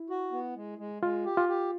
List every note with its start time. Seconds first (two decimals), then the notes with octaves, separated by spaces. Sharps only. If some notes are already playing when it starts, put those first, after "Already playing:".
Already playing: E4
0.10 F#4
0.32 B3
0.55 G#3
0.78 G#3
1.02 G#3 F4
1.25 G4
1.37 F4
1.48 G4